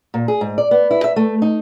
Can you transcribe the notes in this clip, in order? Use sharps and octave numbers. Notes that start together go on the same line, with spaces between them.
A#2
G#4
G#2
D5
B3
E4
E5
A3
D#4